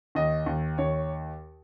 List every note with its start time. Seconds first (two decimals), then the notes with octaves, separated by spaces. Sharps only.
0.15 D#2 D#5
0.46 D#2
0.78 D#2 C#5